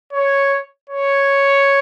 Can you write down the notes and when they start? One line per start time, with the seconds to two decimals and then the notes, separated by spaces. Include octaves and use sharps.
0.13 C#5
0.89 C#5